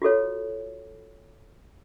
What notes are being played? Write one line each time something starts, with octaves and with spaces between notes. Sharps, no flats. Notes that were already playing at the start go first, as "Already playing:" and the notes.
F4 F#4 A4 C#5